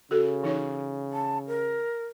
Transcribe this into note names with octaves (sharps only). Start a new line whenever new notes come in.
C#3 F#4 A4
E3 D#4 C#5
A5
A#4